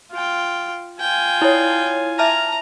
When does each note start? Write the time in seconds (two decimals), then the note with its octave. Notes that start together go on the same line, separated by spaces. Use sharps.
0.12 F4 G5
1.00 F4 G5 G#5
1.42 E4 C#5
2.19 E5 A5 A#5 F6